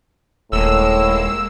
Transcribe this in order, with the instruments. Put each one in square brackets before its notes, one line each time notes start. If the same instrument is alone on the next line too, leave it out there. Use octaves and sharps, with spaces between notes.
[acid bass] D#1 [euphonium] A2 [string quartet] G#3 A#3 [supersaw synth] E6